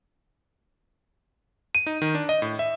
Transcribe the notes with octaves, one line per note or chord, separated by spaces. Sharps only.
D#7
D#4
D#3
D4
D#5
A2
E5